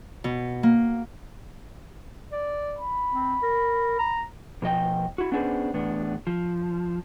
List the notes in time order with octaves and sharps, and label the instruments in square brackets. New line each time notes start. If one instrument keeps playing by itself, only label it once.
[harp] B2
A#3
[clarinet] D5
[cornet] B5
[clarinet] C4
A#4
A#5
[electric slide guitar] B2 F3 D#5 G5
E4 F#4
B3 C#4 D4 G#4 B4 C5
E2 A2 B3 D4
F3